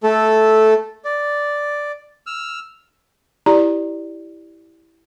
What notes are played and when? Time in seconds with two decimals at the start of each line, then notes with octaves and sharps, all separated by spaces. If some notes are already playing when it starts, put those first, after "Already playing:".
0.03 A3 A4
1.05 D5
2.26 E6 F6
3.46 E4 G4 D5 A#5